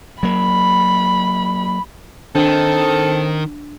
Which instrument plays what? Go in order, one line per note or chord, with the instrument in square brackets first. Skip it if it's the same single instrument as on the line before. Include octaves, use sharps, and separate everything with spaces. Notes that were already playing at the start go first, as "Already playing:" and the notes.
[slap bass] F#3 A#3 [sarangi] B5
[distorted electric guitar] D#3 [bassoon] C4 [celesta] D4 [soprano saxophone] A4